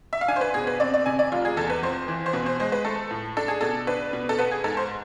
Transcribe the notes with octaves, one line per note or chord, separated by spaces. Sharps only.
E5
F5
D4 G#5
C5
B4
B2 G#4
B4
C4 D5
D5
C3 G#5
D5
F1 F4
G#4
E2 A4
B4
F2 C5
E3
C5
B2 B4
C5
G#3 C5
B4
A3 A4
A2
D4 A4
G#4
B2 A4
D4 B4
B2
A4
B3 B4
G#4
G#2 A4
C5